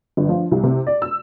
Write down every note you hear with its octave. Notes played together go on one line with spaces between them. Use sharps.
G1
F3
C2
C3
D5
E6